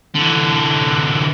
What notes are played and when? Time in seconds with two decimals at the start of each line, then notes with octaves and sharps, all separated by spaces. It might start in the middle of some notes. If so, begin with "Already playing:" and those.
0.15 D3 E3